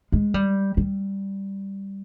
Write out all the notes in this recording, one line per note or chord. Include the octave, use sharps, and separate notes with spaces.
G#3
G3
G3